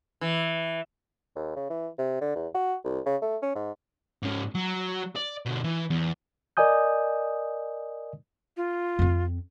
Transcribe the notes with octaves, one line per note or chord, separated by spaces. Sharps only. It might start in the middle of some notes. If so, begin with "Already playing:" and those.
E3
D#2
C#3
E3
C3
D3
E2
F#4
C2
C#3
A3
C#4
G#2
G#2 C#4
F#3
D5
B2 D3
E3
E2
A#4 D5 D#5 G#5 D#6 G6
F4
F2 C4